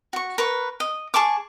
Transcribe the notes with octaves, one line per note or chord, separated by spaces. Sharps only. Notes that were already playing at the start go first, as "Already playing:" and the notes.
F#4 C#6
A#4 B4 C#6
D#5
G#4 A5 C#6 D6